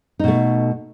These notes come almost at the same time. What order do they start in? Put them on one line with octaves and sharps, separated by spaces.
D#4 B2 A3